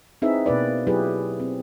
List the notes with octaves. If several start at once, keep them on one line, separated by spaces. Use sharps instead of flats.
C4 D#4 E4 G#4 B4 E5
B2 A#3 B4 D5
F#3 E4 G4 G#4 B4
C4